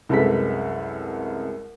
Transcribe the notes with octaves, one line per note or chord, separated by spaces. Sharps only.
C2 F#2 G#3 A4 B4 B6